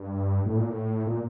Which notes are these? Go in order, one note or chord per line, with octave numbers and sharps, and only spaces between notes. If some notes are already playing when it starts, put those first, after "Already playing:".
Already playing: G2
A2
A#2
A2
A#2